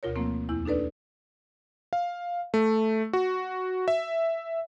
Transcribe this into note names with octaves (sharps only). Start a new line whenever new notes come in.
D2 B2 F4 A#4 C#5
F3 A3 A#3 C4
E2 E4
D4 D#4 A4 B4 D5
F5
A3
F#4
E5